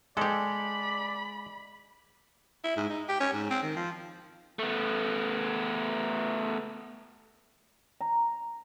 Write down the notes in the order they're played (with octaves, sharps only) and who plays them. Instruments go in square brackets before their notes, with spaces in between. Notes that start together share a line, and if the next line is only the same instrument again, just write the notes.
[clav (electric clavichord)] G#3 [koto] G4 A4 [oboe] D5 [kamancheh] B5
[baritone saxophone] E4
G#2
D#4
G4
C#4
G#2
C4
D#3
F3
[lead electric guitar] A3 B3
[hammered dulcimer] A#5